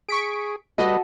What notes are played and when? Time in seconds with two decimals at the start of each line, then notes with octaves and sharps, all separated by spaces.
0.09 G#4 C#6 B6 D7
0.78 G3 F#4 A4 B4 D#5